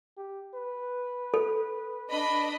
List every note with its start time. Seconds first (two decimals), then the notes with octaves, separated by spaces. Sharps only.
0.17 G4
0.54 B4
1.34 A4
2.09 D4 D#5 B5